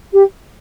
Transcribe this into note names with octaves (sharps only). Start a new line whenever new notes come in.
G4